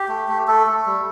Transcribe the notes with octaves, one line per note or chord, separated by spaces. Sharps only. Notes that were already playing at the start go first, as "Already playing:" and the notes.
Already playing: G4
A3
A3
A3 A4
A3
G3